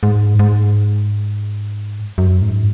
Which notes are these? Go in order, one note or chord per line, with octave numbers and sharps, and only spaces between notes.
G#2
G#2
F#2
G#2